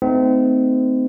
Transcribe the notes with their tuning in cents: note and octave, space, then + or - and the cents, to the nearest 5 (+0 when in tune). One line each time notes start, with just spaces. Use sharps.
A3 +0 C4 -35 D#4 +0